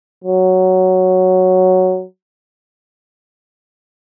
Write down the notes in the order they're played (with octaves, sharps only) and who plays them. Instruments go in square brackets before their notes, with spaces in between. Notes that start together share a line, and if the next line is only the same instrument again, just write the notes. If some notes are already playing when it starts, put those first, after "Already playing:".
[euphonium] F#3